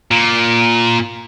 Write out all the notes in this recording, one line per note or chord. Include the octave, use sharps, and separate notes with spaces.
A#2